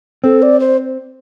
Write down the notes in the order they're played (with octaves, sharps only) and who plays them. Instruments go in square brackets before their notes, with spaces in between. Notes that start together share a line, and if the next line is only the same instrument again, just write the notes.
[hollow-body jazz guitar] C4 [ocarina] A4
[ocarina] D5
C5